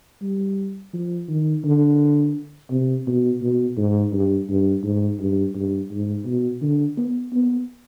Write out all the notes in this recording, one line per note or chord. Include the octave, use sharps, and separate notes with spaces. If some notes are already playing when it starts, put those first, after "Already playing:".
G3
F3
D#3
D3
C3
B2
B2
G#2
G2
G2
G#2
G2
G2
G#2
B2
D3
B3
B3